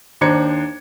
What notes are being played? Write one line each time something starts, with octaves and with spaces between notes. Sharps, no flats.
D#2 D4 C5 A#5 G#6 C#7